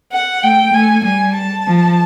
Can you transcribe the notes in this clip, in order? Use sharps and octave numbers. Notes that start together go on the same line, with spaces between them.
F#5
A3 G5
A3 G#5
G3 G#5
A5
F3